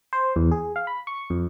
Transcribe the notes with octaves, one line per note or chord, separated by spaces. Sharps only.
C5
E2
G#4
F5
B5
C#6
F2